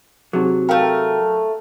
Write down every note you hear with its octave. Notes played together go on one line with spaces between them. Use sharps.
C3 F#3 D#4 G#4
A3 A#4 F5 G5